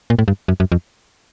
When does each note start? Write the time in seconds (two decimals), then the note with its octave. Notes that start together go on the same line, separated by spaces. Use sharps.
0.10 A#2
0.19 A2
0.28 G2
0.48 F#2
0.60 F#2
0.72 F2